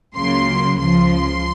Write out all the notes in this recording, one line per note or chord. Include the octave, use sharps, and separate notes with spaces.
C#2 C#3 F#3 A#3 C6
C#2 C#3 F3 C6